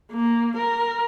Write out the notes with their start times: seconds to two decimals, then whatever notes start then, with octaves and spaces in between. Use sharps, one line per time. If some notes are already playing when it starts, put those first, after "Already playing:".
0.12 A#3
0.57 A#4